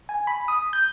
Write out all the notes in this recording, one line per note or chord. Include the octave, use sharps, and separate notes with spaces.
G#5
B5
D#6
G6